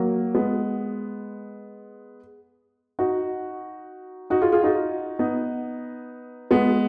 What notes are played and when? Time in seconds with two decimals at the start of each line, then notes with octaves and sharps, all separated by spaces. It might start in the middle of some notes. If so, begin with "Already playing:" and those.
Already playing: F#3 A#3
0.35 G#3 B3
2.99 D#4 F#4
4.30 D#4 F#4
4.41 F4 G#4
4.52 F4 G#4
4.64 D#4 F#4
5.19 B3 D#4
6.51 G#3 B3